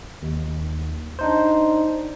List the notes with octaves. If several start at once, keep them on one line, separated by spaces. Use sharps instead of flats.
D#2
D4 D#4 C5